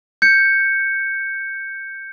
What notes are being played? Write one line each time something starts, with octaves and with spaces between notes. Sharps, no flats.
G6 C#7